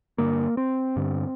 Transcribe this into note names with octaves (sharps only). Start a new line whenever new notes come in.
G2 D3 A#3
C4
G2 D3